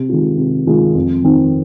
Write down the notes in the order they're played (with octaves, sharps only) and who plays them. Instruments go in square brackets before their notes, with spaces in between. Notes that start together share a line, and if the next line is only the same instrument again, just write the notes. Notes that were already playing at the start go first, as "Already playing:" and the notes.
Already playing: [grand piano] C3
D#3 G#3 F4
C3
D#3 G#3 F4
F2
D#3 C4 D#4